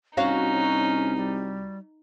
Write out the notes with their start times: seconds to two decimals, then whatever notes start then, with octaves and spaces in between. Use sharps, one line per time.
0.17 C2 C#4 D#4 F#4 C#5 F5
1.16 G3